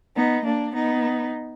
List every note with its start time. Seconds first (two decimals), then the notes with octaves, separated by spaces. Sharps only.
0.16 B3 D#4
0.45 A#3 D4
0.74 B3 D#4